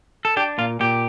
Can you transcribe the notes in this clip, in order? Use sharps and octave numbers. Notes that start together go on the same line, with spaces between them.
A4
D4 G4
A#2 F4
A#2 G4